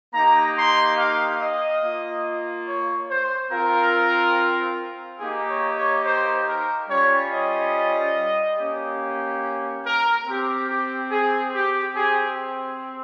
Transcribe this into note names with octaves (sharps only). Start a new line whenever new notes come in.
A#3 D#4 G4 A#5
C6
F5
D#5
A#3 F4
C#5
C5
C4 F4 A#4
A#3 D#4 G4 G#4
C#5
C#5
C5
A#4
G3 C#4 F4 C#5
D#5
A#3 C#4 G4
A#4
C4 G4
G4
G#4
G4
C4 G4 G#4